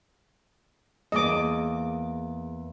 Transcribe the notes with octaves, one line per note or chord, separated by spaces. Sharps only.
E2 A#3 G#4 D#5 D6